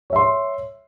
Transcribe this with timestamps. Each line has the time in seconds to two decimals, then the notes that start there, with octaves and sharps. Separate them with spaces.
0.10 C#5
0.13 E5
0.16 C6